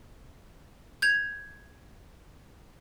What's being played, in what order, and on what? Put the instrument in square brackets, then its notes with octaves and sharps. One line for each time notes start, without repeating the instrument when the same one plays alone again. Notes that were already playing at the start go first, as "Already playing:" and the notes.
[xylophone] G6 G#6 F7